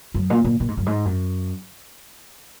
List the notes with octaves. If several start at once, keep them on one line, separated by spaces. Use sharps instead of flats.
F#2
A#2
A#2
A#2
G#2
F#2
G#2
F#2